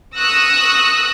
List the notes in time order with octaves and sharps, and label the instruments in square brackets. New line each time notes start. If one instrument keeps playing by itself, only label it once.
[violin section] C#6 D#6 E6 F#6 A#6